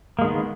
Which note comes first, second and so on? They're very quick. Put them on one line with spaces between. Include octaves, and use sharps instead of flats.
A#3 G#3 D#3 B3